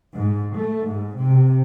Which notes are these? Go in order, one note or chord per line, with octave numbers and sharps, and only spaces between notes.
G#2
A3
G#2
C3